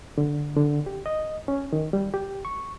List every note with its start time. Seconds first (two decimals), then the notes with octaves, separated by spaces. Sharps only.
0.18 D3
0.56 D3
0.86 G4
1.06 D#5
1.48 C#4
1.73 D#3
1.93 G3
2.14 G4
2.45 C#6